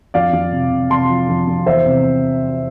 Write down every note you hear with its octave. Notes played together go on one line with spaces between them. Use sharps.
F2 D5 F5
F2
C3
C3
C3 A5 C6
F3
F2
F2
E2 C5 E5
C3